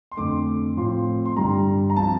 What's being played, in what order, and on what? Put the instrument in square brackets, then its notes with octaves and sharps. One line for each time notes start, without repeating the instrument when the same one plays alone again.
[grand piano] C6
F2 D3 A3 D6
A2 F3 C4 F4 C6
C6
G2 D3 G3 A#5
A#5
F3 C4 F4 A5